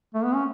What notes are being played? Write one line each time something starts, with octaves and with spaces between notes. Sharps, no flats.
A3
B3
C#4